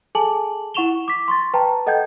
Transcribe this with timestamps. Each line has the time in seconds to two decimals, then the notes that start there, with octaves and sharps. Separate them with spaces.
0.15 G#4 A4 G#5 A5 D6 F#7
0.74 E4 F#5 C#6 E7 F7 G7
1.08 D6 B6
1.28 C6 C#6 A6
1.54 B4 G5 A5 A#5
1.87 A4 D#5 F#5 G5 G6 G#6